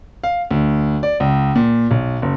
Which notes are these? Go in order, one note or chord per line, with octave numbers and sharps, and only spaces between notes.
F5
D2
D5
C#2
A#2
B1
F#1